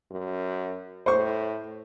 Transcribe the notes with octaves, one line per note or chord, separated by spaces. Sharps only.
F#2
A2 C5 C#6